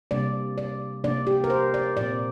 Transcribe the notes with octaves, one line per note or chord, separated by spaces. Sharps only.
C3 G3 A#3 D4 D5
D5
C3 F3 A#3 D4 D5
G4
A#4
C5
D5
A#2 F3 C4 D5